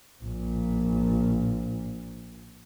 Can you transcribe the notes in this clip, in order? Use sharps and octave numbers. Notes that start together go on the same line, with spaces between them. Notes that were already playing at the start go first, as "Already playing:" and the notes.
A#1 A#2